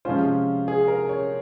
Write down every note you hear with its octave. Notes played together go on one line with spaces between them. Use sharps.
C3 F3 G#3 C#4 F4 C5
G#4
A#4
C#5